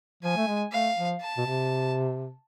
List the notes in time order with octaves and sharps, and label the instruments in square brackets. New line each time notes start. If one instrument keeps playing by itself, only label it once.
[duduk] F3 [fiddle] G#5
[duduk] A3
G#3
[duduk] A3 [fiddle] F5
[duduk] F3
[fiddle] A5
[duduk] B2
C3